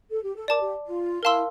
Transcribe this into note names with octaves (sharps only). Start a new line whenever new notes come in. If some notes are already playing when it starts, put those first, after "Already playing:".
A4
G4
A4
A#4 D5 A5 D6
G4
F4
E4 A#4 F5 A5 C6 E6